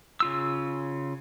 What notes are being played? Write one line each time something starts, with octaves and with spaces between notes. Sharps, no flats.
C#3 F4 E6